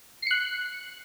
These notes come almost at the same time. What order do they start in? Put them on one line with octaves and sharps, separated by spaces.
C7 C#7 F#6